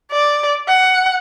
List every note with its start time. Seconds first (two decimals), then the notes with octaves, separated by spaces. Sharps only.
0.12 D5
0.68 F#5